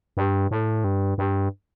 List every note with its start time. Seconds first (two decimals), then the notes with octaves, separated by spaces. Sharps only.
0.17 G2
0.51 A2
0.84 G2
1.18 G2